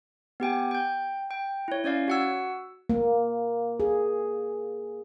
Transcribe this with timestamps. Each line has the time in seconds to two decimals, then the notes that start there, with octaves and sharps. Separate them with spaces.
0.40 B3 G4 G5 G#5
0.71 G5 G6
1.31 G5
1.68 E4 C#5
1.84 C#4 C#5 D5 F5
2.08 F#4 F#5 E6
2.90 A#3
3.80 G#4